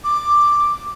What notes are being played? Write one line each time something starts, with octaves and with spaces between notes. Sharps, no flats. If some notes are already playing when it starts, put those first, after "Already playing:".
D6